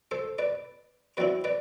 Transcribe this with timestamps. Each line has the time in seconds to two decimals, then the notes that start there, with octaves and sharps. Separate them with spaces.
0.11 A4 C5
0.39 B4 D5
1.17 F#3 C4 E4 B4 D5
1.44 B4 D5